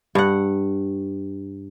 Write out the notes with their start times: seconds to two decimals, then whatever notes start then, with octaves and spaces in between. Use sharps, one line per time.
0.15 G2 F#5